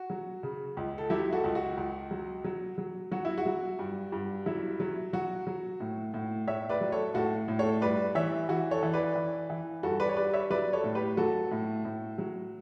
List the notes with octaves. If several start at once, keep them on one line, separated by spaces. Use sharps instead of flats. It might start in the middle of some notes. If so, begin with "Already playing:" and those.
Already playing: F#4
F#3
C#3
C#2
A4
F#3 E4 G4
F#4 A4
C#2
F#4
C#2
F#3
F#3
F#3
F#3 F#4
E4
F#4
F#3
G2
G2
F#3 E4
F#3
F#3 F#4
F#3
A2
A2
A2 C#5 E5
B4 D5
F#3
A4 C#5
A2 F#4 A4
A2
A4 C#5
G2 B4 D5
E3 C#5 E5
E3 F#4
A4 C#5
E3
B4 D5
E3
E3
G2 F#4 A4
B4 D5
C#5
G3 B4 D5
C#5 E5
F#3 B4 D5
A4 C#5
A2
G4 B4
F#3 F#4 A4
A2
A2
F#3